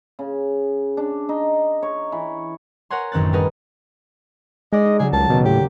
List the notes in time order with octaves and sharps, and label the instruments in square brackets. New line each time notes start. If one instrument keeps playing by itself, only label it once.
[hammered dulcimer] C#3
D4
D#4
C#5
E3
[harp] A#4 C#5 F#5 G#5 C6
A1 F#2 D#3 C4 F#6 A6
G3 F#4 G#4 A#4 B4 D#5
[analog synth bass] G#3 [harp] D#4 D5 [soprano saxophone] D#5
[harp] D#4
[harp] C#3 F#3 G3 [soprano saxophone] G#4
[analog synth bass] C#2 [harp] A#3 [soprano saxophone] A5
[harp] D#2 [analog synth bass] B2
[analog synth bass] A2 [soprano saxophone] G4